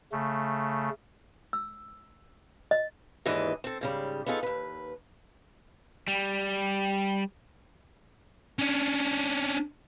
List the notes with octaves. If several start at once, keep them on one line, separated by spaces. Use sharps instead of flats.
C#3 A3
E6
D#5
D#2 G#2 E3 D4 B4 D#5
C4 A4
G#2 C#3 G3
B3 D#4 F4 G#4 A4
D#2 B4
G3
C#4 D4